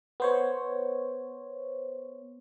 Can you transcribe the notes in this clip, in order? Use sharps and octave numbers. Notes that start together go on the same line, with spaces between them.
B3 C5 C#5